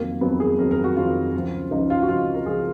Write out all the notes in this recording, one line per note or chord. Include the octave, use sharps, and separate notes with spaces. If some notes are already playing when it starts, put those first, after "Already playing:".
Already playing: F2 D#3 F#3 A#3
F2 D#3 F#3 B3
G#4
F2 D#3 F#3 A#4
A#4
F#4
F2 D#3 F#3 F4
C#2 C#3 F3
C#2 C#3 F3 D#4
F4
F#4
C#2 C#3 F3 F4
A#4
C#2 C#3 F3 G#4